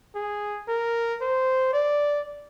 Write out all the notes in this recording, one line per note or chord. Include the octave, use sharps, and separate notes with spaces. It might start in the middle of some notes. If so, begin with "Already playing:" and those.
G#4
A#4
C5
D5